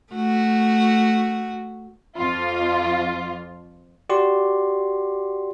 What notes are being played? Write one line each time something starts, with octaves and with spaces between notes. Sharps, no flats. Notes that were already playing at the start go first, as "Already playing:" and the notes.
A3 F#4
F2 F4
F#4 G4 D5 C6